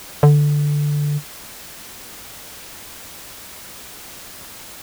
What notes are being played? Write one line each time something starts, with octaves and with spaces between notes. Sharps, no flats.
D3